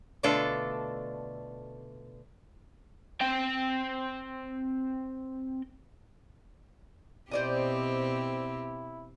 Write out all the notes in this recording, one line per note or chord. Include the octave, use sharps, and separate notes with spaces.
B2 D3 A3 D4 F4 A4
C4 G5
B2 C4 E4 G4 C5 D5 D#5